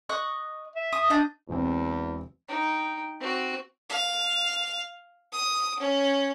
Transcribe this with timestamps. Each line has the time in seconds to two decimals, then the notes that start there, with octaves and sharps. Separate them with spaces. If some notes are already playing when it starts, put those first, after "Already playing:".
0.09 D#5 C#6 F#6
0.76 E5
0.92 D#6
1.10 D4 D#5 G6
1.49 E1 E2 C4
2.48 D#4 G5
3.20 C4 F#4
3.89 F5
5.33 D#6
5.80 C#4